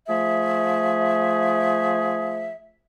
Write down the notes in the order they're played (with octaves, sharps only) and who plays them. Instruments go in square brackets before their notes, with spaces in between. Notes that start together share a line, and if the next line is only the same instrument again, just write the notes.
[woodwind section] F3 A3 G#4 E5